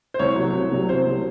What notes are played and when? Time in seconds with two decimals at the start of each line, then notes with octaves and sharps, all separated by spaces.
0.14 C5
0.19 C2 C#5
0.36 C3 F#3
0.53 C2
0.72 C3 F#3
0.89 C2 C5
1.06 C3 F#3